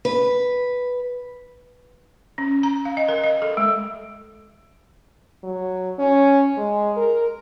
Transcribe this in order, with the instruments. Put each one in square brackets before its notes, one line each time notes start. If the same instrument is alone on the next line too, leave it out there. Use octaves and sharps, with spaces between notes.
[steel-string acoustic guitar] B4
[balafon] C#4
A#5
F5
D#5
A#4
D#5
A4
G#3
[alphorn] F#3
C#4
G#3
A#4